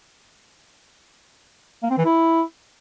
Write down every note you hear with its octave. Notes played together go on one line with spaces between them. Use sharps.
A#3
C4
E3
E4